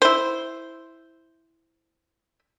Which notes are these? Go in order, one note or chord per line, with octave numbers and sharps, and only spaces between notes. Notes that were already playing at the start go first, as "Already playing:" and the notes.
E4 C5